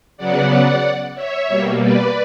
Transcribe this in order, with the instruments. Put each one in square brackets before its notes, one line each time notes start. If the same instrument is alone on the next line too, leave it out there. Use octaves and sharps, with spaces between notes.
[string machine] C#3 F#3 B3 D5 F#5
C#5 E5
B2 G3 A#3
B4 D5